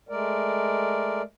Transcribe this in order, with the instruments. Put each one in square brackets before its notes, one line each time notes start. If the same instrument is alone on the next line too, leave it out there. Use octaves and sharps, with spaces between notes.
[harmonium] G#3 A3 A#4 D5